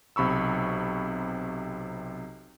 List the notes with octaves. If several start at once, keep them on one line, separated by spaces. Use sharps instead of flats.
B1 C3 B5 C#6 E6